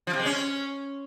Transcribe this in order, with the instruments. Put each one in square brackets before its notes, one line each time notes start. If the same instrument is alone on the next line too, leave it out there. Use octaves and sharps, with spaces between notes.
[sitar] F3
C3
G#3
C#4